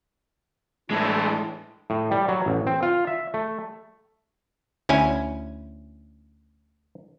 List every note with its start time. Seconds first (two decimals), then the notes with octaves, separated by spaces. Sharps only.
0.90 A2 E3 G#3 A3 D4 E4
1.90 A2
2.11 G3
2.28 F#3
2.46 A1
2.67 C4
2.83 F4
3.07 E5
3.34 A3
4.89 D2 C#4 E4 G#5